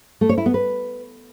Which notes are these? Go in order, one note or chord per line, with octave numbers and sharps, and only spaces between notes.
A3
C#5
E4
B3
B4